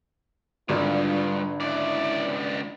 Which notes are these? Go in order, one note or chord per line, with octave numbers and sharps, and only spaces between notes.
G#1 G2 D3 F4
C#2 E4 D5